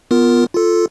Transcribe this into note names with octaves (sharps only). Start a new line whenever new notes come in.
B3 F4 A#4
F4 A4